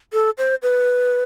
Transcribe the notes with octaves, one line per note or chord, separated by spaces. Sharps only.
A4
C5
B4